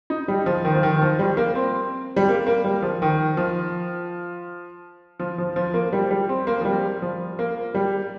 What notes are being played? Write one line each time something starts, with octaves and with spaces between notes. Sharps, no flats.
D#4
G3
F3
D#3
F3
D#3
D#3
F3
G3
A#3
C4
G3
A#3
A#3
G3
F3
D#3
F3
F3
F3
F3
A#3
G3
G3
C4
A#3
F3
G3
F3
A#3
G3